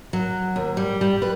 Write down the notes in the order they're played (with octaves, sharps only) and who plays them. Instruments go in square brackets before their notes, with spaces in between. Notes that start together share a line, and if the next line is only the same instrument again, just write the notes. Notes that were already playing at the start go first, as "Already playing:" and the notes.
[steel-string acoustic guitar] F#3
D#2
G3
G3
B4